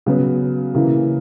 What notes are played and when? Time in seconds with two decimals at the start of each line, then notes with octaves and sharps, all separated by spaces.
0.06 C#3 F#3 B3
0.74 C#3 E3 A#3 E4